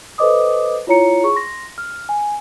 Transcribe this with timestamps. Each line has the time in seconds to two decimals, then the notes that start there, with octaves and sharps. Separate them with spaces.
0.18 A4 B4 C5 D#5 D6 D#6
0.87 E4 F4 C#5 A#5 C#7
1.24 G#4 C#6
1.36 C6 A#6
1.78 F6
2.09 G#5